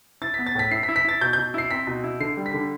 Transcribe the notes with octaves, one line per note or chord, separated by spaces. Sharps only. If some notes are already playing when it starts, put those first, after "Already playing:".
E4 A6
B3 B6
A6
A2 B6
E4 C7
B6
E4
B6
E4 A6
B2 G6
B2 G6
E4 C7
C4 B6
B2
E4
D3 C7
G3
B6
D3